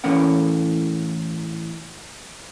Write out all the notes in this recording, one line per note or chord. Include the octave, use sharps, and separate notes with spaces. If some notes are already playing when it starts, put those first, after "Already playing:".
A2 E3 A3 A#3 C#4 F#5